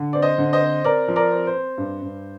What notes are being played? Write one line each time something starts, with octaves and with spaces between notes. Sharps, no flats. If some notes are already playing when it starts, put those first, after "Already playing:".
Already playing: D3
C4 D5
C5 D#5
D3
C5 D#5
C4
C4 A#4 D5
F3
A#4 D5
C4
C5
C4
G2
G2